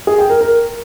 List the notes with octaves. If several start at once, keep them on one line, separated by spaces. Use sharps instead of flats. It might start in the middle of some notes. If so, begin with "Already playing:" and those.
G#4
G5
A#4
A#4